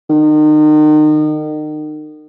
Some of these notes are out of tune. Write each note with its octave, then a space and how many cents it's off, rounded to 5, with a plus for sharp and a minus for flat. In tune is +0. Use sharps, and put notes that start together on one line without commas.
D#3 -35